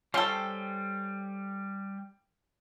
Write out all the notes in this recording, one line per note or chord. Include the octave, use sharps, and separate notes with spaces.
G3 C#4 A4 C5 G5